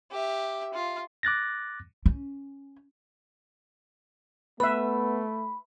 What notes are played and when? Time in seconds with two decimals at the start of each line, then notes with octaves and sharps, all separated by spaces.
0.11 G4 E5
0.74 F4
1.23 D6 F#6 A6 A#6
2.06 C#4
4.60 A3 B3 B4 E5 B5